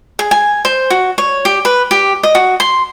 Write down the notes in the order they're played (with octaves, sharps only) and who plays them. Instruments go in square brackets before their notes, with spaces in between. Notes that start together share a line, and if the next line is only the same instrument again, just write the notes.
[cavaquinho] G#4
G#5
C5
F#4
C#5
G4
B4
G4
D#5
F#4
C6